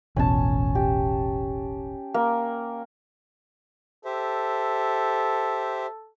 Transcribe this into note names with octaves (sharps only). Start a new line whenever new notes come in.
E1 A1 B2 C#4 G#5 A5
G4
A#3
G4 A4 C5 E5